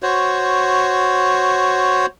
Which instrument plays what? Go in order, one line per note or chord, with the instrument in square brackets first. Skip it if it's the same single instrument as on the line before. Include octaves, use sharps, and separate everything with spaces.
[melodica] F#4 C5 C#5